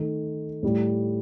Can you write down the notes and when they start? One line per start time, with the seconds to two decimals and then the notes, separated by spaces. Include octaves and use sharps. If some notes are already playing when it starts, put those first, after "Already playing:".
Already playing: D#3 A3
0.63 A2 G3